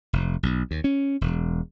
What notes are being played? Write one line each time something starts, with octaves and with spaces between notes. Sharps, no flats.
F1
B1
D#2
C#4
E1